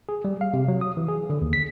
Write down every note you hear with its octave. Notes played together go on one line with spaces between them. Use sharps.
G#4
G3
F5
C3
F#3
D#6
E3
G#4
D3
D#2
B6